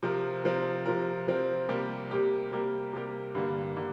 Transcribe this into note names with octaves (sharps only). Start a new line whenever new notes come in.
C3 F3 C4 A#4
C3 F3 C4 A#4
C3 F3 C4 A#4
C3 F3 C4 A#4
C3 G3 A#3 G4 A#4
C3 G3 A#3 G4 A#4
C3 G3 A#3 G4 A#4
C3 G3 A#3 G4 A#4
G2 D3 G3 A#3
D3 G3 A#3